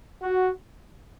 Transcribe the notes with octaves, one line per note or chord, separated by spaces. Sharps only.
F#4